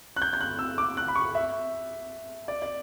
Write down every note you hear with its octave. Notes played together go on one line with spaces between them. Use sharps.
F#6
G6
G6
F#6
E6
D6
F#6
B5
C#6
E5
D5
D5